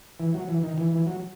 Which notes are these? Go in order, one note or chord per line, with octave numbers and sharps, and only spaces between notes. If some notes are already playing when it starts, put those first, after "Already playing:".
E3
F#3
E3
D#3
E3
E3
F#3